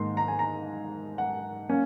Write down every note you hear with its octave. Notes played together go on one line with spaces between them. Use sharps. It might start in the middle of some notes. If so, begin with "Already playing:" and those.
Already playing: G#2 D#3 A#3 D#4 C6
A#5
G#5
A#5
F#5
A#3 C#4